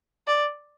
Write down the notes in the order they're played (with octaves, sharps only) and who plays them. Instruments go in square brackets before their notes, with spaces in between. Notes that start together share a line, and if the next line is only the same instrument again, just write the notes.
[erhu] D5